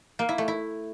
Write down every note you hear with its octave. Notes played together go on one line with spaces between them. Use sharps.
A#3
E4
A3
E4